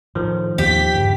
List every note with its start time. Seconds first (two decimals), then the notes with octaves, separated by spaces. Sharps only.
0.15 A2 D#3 F3
0.58 D#2 G4 B6
0.94 G2 C#3